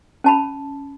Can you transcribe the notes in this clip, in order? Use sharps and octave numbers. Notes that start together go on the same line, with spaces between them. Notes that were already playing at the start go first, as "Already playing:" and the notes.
C#4 A5 B5